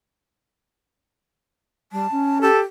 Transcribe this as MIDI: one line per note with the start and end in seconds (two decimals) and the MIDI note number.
1.92 2.07 55
1.92 2.38 81
2.11 2.48 61
2.42 2.63 67
2.42 2.59 69